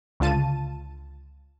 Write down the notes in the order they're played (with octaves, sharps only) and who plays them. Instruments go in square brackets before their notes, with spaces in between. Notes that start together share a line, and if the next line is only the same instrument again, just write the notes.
[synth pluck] C#2 D3 F4 A5 D#7